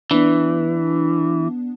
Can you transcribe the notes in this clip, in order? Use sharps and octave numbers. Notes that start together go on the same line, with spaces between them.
E3 B3 D4